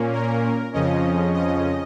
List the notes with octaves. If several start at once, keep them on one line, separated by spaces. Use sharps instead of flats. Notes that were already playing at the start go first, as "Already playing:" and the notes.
Already playing: A#2 A#3 C#4
A#4
F2 C#3 F3 C#4 D#5
D#5